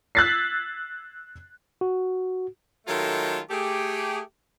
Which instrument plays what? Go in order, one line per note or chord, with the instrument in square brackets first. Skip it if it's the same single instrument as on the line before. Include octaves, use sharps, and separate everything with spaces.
[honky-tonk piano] E6 F#6 G#6 A6 B6 C7
[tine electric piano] F#4
[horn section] D#3 F#3 G#3 A3 F4 A4
A3 G4 G#4